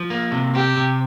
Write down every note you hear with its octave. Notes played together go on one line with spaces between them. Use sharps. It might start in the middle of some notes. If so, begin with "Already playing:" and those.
Already playing: F3
A#3
C3
C4 G4
C3